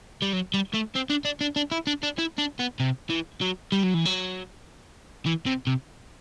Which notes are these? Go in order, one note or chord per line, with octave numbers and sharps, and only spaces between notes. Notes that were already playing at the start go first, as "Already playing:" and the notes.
G3
F#3
G3
A3
C4
D4
D4
D4
D4
E4
D4
D4
E4
D4
B3
C3
E3
F#3
G3
F#3
E3
F#3
E3
C3
C3